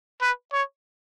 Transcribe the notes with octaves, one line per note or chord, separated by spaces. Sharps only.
B4
C#5